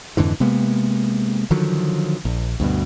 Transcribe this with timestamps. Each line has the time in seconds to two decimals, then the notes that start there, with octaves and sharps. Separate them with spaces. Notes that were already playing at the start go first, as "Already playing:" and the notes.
0.17 F2 G#2 D3 E3
0.40 C3 G#3 A#3 B3
1.51 D3 D#3 F3 F#3
2.25 A#1
2.60 D2 G2 B2